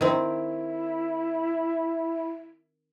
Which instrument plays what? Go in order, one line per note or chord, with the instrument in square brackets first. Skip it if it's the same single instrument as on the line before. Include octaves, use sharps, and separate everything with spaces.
[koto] D#3 C4 [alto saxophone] E4